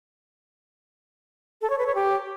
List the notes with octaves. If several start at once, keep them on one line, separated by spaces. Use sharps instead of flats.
A4
C#5
B4
C#5
G4